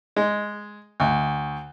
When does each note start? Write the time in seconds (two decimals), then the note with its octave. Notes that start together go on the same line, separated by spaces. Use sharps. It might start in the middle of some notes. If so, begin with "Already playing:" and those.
0.16 G#3
1.00 D2